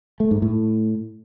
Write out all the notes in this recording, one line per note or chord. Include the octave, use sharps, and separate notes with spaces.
A3
G#2
A2